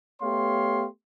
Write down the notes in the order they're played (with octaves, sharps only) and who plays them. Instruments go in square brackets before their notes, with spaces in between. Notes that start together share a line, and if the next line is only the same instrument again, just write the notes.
[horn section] A3 B3 G4 C#5 F5 C6